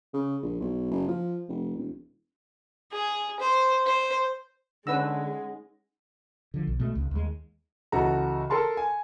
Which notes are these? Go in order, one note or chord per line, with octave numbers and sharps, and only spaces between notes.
C#3
A#1
B1
F#1
F3
F1
E1
G#4
C5
C5
D3 G#3 C#4 D#4 B4 F#5 E6 A#6
D3 F3
B1
B2 G#3 A3
C#2
D#2 G#3
C#2 E3 F#4 A4 A#5
A4 A#4 A5 C6
G#5